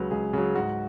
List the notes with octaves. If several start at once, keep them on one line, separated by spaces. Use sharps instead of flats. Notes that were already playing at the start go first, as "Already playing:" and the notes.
Already playing: C#2 C#3 F#3 B4
C#2 G#4
C#3 F#3
G#2 F#4